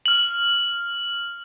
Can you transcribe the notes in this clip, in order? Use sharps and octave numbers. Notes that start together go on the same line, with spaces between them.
F6 F#7